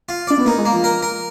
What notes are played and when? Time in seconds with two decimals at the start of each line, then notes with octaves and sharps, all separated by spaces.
0.09 F4
0.27 D4 D5
0.38 B3
0.45 A#3 D#4
0.58 G#3
0.66 A#3
0.71 F3
0.84 A#4
1.03 A#4